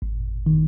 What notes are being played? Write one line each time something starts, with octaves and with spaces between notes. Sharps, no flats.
G#1
D#3